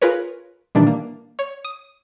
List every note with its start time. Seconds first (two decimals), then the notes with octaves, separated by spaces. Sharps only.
0.02 F4 G#4 A#4 B4 C#5
0.75 A#2 D#3 E3 G3 D4
0.87 A#3
1.39 C#5
1.65 D#6